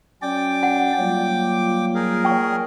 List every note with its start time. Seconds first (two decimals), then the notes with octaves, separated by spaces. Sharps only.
0.22 F#3 C#4 D5 G5 D6
0.63 F#5
0.99 F#3 G3 A#3 F4
1.95 G#4 A#4
2.25 G5 C#6